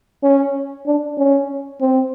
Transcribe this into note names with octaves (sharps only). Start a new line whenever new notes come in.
C#4
D4
C#4
C4